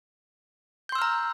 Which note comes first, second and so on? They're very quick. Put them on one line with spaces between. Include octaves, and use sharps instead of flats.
G6 C6 E6 F6 A#5